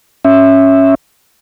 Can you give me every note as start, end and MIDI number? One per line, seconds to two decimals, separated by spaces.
0.25 0.95 61
0.25 0.95 76